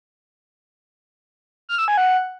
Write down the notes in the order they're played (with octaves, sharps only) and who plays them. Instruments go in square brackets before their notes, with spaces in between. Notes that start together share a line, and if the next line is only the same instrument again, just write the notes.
[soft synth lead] F6
E6
G#5
F#5